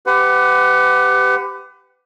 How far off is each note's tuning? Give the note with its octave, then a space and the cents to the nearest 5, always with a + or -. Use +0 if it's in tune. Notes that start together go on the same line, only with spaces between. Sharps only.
G4 +0 B4 +35 F#5 +0